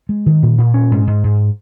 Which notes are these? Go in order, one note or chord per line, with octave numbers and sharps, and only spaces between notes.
G#3
D#3
A#2
A#2
C#4
G#2
G#2
G#2